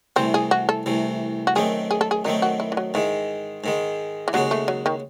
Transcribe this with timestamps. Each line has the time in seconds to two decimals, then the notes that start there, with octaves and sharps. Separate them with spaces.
0.16 C2 C3 E3 A3 C4
0.34 G#4
0.51 F#4
0.69 A4
0.86 C2 C3 E3 A3
1.47 F#4
1.56 F#2 D#3 A3 C4 G#4
1.91 G#4
2.01 A4
2.11 G#4
2.25 F#2 D#3 A3 C4 D#4
2.42 F#4
2.60 E4
2.72 E3
2.77 F#3
2.94 G#2 D#3 E3 G#3
3.64 G#2 D#3 G#3
4.28 E3
4.33 D#2 C#3 F#3 G#3 C#4 F#4
4.51 A3
4.68 F#3
4.86 D#3